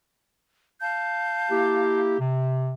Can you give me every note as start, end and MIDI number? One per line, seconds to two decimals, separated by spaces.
0.79 2.00 77
0.79 2.00 81
0.79 2.00 91
1.50 2.17 58
1.50 2.17 64
1.50 2.17 67
2.20 2.73 48